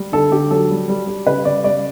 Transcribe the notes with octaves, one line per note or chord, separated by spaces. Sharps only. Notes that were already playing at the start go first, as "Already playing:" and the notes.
Already playing: G3
D3 A4
D3 G4
F#3 A4
G3
G3
G3
C#3 B4
C#3 D5
G3 D5